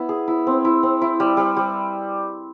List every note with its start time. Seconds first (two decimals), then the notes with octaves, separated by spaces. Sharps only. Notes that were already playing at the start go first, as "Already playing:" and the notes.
Already playing: B3 E4
0.09 G#4
0.28 E4
0.47 C4
0.65 E4
0.83 C4
1.02 E4
1.20 G3
1.37 G3
1.57 G3